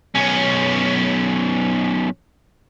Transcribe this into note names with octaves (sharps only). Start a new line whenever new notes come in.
B1 C#4